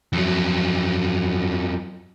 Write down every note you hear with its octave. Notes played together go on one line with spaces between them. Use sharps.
F2 F#3